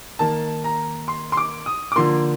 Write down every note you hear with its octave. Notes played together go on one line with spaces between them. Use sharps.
D#3 A#3 A5
A#5
C6
C6
D6
D#6
D6
D3 F3 A#3 C6